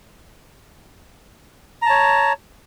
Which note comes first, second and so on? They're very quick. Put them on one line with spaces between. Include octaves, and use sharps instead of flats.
A#5 A5 C#5